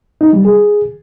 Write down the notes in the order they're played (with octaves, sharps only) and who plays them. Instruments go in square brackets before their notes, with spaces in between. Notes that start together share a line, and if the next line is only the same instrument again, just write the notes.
[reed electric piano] D#4
G3
G#4